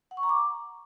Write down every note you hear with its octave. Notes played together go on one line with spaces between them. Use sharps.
F#5
C#6
A#5
D6